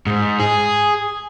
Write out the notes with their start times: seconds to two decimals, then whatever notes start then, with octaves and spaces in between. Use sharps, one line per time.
0.06 G#2
0.40 G#4